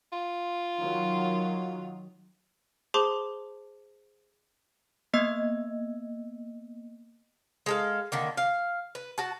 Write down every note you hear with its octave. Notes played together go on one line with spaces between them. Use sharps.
F4
D#3 F#3
G#4 C5 A5 C6 D6
A#3 B3 D#5 E6
G#3 A4 F5
D3 D#3 A#3
F5
B4
F#4 A5